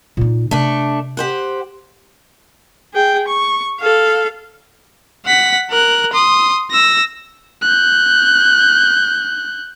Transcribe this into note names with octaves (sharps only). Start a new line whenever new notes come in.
A#2 D#4
C3 A3 D4
G4 C5 F#5
G#4 G5
C#6
A4 F5
F#5 B6
A#4 F#6
C6 D#6
E6 A#6
F#6 G6